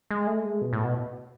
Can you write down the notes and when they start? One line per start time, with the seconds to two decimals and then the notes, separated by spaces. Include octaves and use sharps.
0.11 G#3
0.27 A3
0.45 G#3
0.62 B2
0.73 A2
0.84 B2